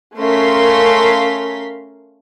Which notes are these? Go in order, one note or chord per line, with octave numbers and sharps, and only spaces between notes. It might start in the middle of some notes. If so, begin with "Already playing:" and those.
A3 C#4 A#4 F5 C6 B6